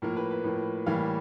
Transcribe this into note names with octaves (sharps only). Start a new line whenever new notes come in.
A2 F3 A#3 A#4
B4
B4
A2 F3 A#3
A2 E3 G3 A#3 F5